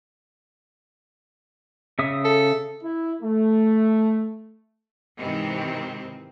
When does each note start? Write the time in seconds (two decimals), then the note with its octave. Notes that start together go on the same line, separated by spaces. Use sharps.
1.99 C#3 E5 D#6
2.25 A4
2.82 E4
3.22 A3
5.18 G#2 C3 D#3 E3 C4